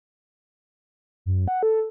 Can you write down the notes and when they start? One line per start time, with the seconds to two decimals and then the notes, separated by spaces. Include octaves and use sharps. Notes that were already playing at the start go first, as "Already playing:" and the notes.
1.26 F#2
1.48 F#5
1.63 A4